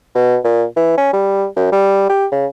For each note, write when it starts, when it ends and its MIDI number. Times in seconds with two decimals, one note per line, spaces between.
0.15 0.37 47
0.44 0.65 46
0.77 0.93 52
0.98 1.11 61
1.13 1.46 55
1.56 1.68 42
1.72 2.07 55
2.10 2.26 67
2.32 2.46 49